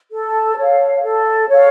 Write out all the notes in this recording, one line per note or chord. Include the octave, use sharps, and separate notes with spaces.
A4
C#5 F5
A4
C#5 F5